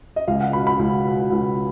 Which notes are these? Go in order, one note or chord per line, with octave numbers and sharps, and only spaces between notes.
D#5
C#2 F5
F#5
B2 B5
B5
C#2
B2
C#2